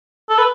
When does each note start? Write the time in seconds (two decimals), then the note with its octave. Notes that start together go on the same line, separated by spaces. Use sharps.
0.29 A4
0.38 B4